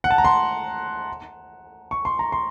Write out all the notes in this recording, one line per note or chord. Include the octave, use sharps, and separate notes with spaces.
F#5
A5
A#5
C6
C#6
C6
A#5
C6